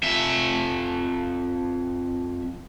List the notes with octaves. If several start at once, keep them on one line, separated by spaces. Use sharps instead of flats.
F2 E5